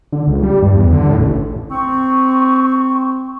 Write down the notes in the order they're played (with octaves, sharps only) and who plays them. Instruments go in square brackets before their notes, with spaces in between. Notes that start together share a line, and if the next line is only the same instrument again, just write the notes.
[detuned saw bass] D3
C#2
G3
G2
E2
D3
A2
A1
[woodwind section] C4 C#6